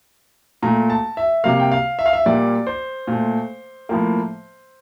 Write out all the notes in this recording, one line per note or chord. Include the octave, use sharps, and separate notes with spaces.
A#2 A3 A#5
A5
E5
C3 G3 A#3 F5
G5
F5
E5
F5
E5
A#2 G3 A#3 D5
C5
A#2 A3
A2 F3 A#3